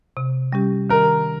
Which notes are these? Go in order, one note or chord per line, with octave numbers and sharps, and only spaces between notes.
C3
G3 C#4 G4
D#3 A#4